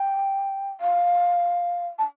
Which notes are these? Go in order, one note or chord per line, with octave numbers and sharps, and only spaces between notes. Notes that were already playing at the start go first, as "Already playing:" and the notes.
Already playing: G5
F5
A5